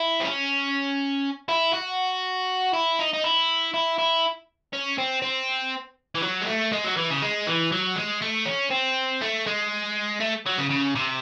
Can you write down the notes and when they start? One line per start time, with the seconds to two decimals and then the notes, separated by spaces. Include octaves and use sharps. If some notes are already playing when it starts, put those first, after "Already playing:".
Already playing: E4
0.20 C4
0.24 C#4
1.49 E4
1.74 F#4
2.74 E4
2.99 D#4
3.13 D#4
3.23 E4
3.74 E4
3.98 E4
4.73 C#4
4.98 C4
5.22 C4
6.15 E3
6.23 F#3
6.41 G#3
6.47 A3
6.72 G#3
6.84 F#3
6.97 E3
7.10 C#3
7.22 G#3
7.47 E3
7.72 F#3
7.96 G#3
8.22 A3
8.46 C#4
8.71 C4
9.21 A3
9.47 G#3
10.20 A3
10.46 F#3
10.58 C#3
10.70 C#3
10.95 C3